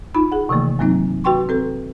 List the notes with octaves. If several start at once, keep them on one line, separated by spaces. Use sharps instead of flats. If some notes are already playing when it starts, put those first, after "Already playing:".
D#4 F4 B5
G#4 F#5
C3 D#3 E3 A3 A#3
G2 F#3 A#3 C4 D#4
F#4 B4 G5 C6 C#6
C4 A4 B4